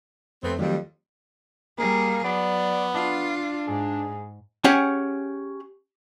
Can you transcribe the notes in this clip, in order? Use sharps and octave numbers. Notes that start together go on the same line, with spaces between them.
F2 A3 B3 C4
F2 D#3 F#3 G3 A3
G3 A#3 G#4 A#4
F#3 B3 D5
D4 F4
G#2 G#4
C#4 G4 G#4 F#5 G#5